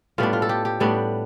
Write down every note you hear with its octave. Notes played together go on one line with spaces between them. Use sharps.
A2 G3 B3 D4 F4
F4
A4
G4
G4
A2 G3 B3 D4